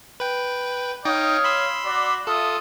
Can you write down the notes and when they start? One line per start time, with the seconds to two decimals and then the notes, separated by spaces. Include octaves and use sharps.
0.20 B4 G5
1.05 D#4 C#5 D#5 F5 G5 D#6
1.44 B5 C6 E6
1.84 F#4 D5
2.27 F4 A4 E5 D#6